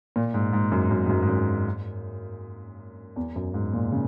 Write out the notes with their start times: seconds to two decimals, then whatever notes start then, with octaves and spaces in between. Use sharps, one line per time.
0.16 A#2
0.34 G#2
0.53 G#2
0.72 F#2
0.91 F#2
1.06 G#2
1.09 F#2
1.22 G#2
1.28 F#2
3.16 E2
3.36 F#2
3.54 G#2
3.73 A#2
3.92 C#3